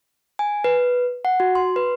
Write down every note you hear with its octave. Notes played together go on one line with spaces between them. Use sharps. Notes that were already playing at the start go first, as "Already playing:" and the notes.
G#5
B4
F#5
F#4
C6
B4